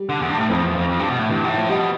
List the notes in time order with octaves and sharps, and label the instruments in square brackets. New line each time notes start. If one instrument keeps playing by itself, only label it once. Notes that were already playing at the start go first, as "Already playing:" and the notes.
Already playing: [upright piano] G3
[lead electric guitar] D3
E2
G2
A2
[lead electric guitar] F2 [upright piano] F3
[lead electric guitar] E2
F2
F2
G2
B2
A2
[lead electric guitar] G2 [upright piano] E3
[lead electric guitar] B2
A2
[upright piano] F3
[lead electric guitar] B2 [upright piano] G3